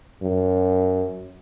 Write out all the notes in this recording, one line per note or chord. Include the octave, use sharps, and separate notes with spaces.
F#2